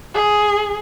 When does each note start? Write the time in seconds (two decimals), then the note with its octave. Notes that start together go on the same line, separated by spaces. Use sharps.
0.14 G#4